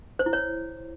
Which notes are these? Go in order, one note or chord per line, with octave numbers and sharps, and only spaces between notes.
C5
E4
C#5